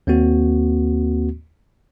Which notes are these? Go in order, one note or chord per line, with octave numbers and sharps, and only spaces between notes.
D#2 A#3 C4 F#4